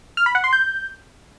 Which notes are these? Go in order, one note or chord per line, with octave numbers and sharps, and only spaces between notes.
F6
B5
F#5
C6
G6